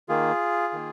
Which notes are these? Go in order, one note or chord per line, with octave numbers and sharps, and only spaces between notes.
D#3 A#3 F4 G#4
D#3 A#3